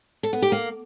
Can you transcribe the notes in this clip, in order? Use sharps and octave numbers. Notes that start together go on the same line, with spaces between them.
A4
B3
G4
A#3